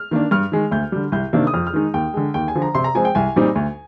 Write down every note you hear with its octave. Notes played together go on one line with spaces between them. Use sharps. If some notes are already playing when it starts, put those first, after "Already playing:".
Already playing: F6
D#3 A#3 D4
G2 F6
D#3 G#3
D2 G6
D3 G3
C2 G6
C3 D#3 A#3 D4
D#6
F2 F6
F6
D#3 G#3 D#4
D#2 G5
D3 G#3
D#2 G5
G#5
D3 F3
A#5
C3 C6
A#5
F3 G#3 C4 G#5
G5
C2 G#5
A#2 G3 C4 D#4
D2